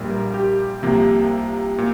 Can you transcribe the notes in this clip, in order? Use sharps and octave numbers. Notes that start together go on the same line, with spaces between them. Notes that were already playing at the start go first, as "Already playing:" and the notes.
Already playing: A#1 A#2 G3 A#3
A#4
G4
C2 C3 F3 A#3
A#2